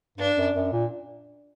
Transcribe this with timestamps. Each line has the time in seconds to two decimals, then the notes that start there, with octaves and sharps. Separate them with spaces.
0.18 G2 D4
0.37 F#2
0.55 F#2
0.72 A#2